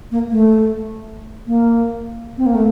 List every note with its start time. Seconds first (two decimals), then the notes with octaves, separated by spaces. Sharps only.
0.11 A#3
0.30 A3
1.47 A#3
2.38 C4
2.46 A#3
2.55 A3